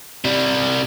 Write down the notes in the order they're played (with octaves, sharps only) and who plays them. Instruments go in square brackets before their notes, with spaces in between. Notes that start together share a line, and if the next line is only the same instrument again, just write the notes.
[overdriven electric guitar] C3 G3